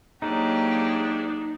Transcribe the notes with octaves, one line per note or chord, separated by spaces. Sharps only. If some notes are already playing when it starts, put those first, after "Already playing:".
G#2 F#3 A#3 D4 D#4 G4